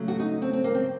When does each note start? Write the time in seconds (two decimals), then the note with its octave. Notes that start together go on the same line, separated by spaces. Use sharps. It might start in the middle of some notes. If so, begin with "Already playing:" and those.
Already playing: C#3 F#3 A3
0.08 F#4
0.20 D#4
0.42 C4
0.53 C4
0.64 A#3
0.75 C4